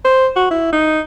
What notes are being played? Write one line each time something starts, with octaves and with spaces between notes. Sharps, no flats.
C5
F#4
E4
D#4